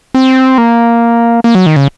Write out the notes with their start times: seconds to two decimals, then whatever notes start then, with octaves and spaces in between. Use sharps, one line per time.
0.14 C4
0.58 A#3
1.44 A#3
1.55 F#3
1.66 D#3
1.76 C#3